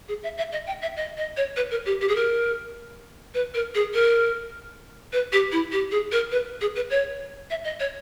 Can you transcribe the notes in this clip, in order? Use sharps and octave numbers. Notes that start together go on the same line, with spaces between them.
G#4
E5
E5
D#5
G5
E5
D#5
D#5
C#5
B4
A#4
G4
G4
G#4
A#4
B4
A#4
G#4
A#4
B4
G4
E4
G4
G#4
A#4
B4
G#4
B4
C#5
E5
D#5
C#5